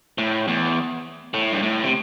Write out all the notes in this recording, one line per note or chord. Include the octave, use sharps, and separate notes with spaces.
A2
E2
A2
G2
A2
C3